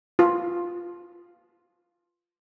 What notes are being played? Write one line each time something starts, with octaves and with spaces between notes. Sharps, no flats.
F4 B4